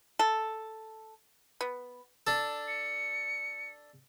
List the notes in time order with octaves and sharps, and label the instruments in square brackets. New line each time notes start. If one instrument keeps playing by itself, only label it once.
[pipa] A4
B3
[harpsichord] D4 A4
[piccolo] C#7